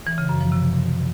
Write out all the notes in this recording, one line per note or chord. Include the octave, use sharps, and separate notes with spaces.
E3
C#3
F#2
F3
C3